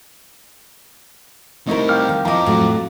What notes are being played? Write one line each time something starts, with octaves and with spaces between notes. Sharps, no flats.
G3 A3 C4 D#4 E4 A#4 D#5 C#6
F5 G5 D6 F6 G6
D#3
F3 C4 E4 D#5 F5 A#5 D6
A2 F#3